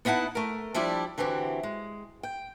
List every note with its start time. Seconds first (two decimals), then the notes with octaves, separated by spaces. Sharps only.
0.05 B3 D#4 E4 F#5 A5
0.35 A3 A#4
0.74 F3 G3 D4 E4 D5
1.18 D3 E3 C4 F#4 G4
1.63 G#3
2.23 G5